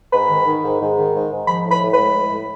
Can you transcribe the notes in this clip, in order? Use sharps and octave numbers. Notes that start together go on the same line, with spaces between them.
G#2 B5
D#3
D#3
G#2
G#2
D#3
G#2
G#2
F3 B5
A2
B5
A2
B5
G#3
A2
A2